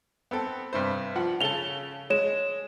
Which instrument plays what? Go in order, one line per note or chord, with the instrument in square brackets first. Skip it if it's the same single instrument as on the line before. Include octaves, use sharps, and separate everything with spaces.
[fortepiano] B3 C4 A4
G2 C3 C5
F3 F#5
[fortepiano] C#3 A4 A5 [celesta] F7 G7
[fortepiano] G#3 [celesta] C#5 E7